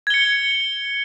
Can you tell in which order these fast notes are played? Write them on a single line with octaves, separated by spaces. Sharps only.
G#6 G7 C#7